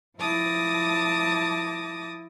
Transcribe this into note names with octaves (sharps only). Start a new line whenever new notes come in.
F3 E4 A5 D6 D#6 A#6